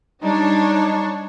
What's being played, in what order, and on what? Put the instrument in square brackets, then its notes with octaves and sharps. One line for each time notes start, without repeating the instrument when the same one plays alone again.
[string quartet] G3 [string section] D4 C#5 [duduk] D#4